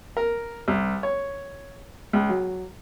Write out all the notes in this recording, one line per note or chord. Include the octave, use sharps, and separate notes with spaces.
A#4
C2
C#5
C#2
F#3